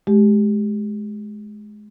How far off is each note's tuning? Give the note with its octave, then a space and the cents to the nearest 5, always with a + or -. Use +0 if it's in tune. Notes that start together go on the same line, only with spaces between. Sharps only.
G#3 +25 G4 +0